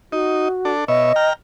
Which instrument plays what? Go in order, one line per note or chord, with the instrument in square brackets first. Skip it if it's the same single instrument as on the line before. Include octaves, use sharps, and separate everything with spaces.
[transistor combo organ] D#4 [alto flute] F#4
[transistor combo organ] D4 A4
[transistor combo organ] B2 C#5 E5 [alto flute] D#5
[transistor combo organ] G5 A#5 F6